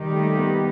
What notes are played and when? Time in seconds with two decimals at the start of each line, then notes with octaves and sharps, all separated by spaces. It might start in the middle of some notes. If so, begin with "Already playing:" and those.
Already playing: D#3 G3 D#4 G4
0.13 A3
0.37 B3